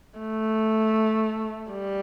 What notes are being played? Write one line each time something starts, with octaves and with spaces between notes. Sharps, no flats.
A3
G3